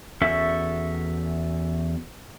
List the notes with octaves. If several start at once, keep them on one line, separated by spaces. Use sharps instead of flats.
E2 C#4 F#4 A4 E5